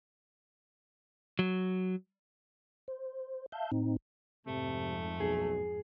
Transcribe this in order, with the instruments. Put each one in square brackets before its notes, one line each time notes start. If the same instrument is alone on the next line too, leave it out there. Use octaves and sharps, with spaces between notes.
[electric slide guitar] F#3
[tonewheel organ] C5
E5 F5 A5 G6
A2 C4 D#4
[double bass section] F2 G#2 [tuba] C3 [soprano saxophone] A3
[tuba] B1 [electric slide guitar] G#4